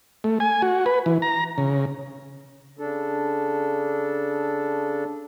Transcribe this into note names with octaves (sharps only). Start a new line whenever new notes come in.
A3
G#5
F#4
B4
E3
A#5
C#3
C#3 D4 A4